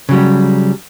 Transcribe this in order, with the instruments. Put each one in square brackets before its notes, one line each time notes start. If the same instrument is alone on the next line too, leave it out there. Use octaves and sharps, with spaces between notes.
[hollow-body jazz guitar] C#3 F#3 G3